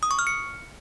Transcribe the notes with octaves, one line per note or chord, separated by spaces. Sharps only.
D#6
C#6
F6
C#7